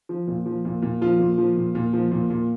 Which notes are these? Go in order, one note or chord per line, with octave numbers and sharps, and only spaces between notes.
F3
A#2
F3
A#2
A#2
F3 F4
A#2
F3
A#2
A#2
F3
A#2
A#2